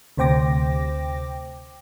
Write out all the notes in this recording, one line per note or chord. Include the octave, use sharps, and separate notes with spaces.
D2 C3 C5 G5 D6 A#6